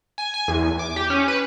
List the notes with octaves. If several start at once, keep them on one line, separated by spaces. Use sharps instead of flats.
G#5
G#5
E2
D6
G4
C#4
B4